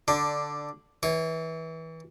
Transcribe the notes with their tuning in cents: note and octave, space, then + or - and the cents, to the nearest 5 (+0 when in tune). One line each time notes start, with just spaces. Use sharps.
D3 +0 D4 +10
E3 -25 C#5 +0